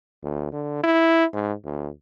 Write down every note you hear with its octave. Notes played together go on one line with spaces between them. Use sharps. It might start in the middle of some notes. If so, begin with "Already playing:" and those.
D2
D3
E4
G#2
D2